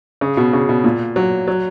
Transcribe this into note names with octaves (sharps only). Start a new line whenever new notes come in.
C#3
B2
C#3
B2
A#2
F#3
F#3